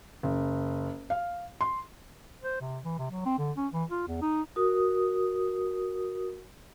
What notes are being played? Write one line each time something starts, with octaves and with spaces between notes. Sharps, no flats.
F#1
F5
C6
C5
C3
E3
C3
F#3
C4
D3
C#4
E3
F4
E2
D#4
F#4 A#4 D#6